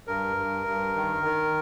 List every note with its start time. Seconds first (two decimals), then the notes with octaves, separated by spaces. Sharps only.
0.07 G2 A#4
0.37 G2
0.66 G2
0.96 D#3
1.25 D#3